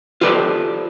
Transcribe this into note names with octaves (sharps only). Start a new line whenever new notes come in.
F4 G4 A4 B4 C5 D5